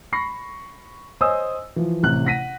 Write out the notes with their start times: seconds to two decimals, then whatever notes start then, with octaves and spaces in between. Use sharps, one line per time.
0.12 B5 C#6 A#6 C7
1.21 C5 C#5 D#5 G#5 D#6 E6
1.76 E3 F3
2.03 A1 C3 F#6
2.25 F#5 A#6 B6 D#7